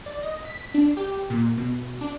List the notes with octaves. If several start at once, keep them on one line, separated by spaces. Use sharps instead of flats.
D5
D#5
B6
D4
G4
A#2
B2
D4